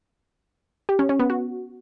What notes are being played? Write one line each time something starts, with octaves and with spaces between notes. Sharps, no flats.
G4
C#4
C#4
B3
F#4